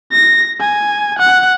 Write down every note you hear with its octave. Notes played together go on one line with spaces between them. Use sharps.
A#6
G#5
F#5